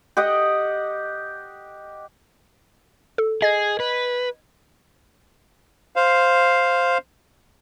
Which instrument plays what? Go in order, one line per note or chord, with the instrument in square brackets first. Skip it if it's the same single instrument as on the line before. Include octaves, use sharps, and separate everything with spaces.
[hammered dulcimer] G4 D#5 F#5
[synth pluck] A4
[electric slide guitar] G#4 [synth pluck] D#5 G#6
[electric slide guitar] B4
[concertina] C5 F5